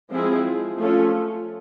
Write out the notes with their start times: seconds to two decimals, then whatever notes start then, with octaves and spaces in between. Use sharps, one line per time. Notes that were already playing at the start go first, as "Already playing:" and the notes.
0.10 F3 G#3 C4 E4 G#4
0.78 F3 A3 C#4 F4 A4